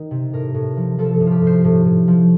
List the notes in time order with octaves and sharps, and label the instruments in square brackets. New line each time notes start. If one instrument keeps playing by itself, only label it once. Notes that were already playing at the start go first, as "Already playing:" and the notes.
Already playing: [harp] D#3
C3
A2 A#4
A2
F3
F3 A4
A4
A2
F4
G4
A2
C5
A2
A2
F3